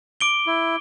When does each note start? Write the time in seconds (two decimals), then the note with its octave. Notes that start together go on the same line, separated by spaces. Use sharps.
0.21 D6 D7 G7
0.47 E4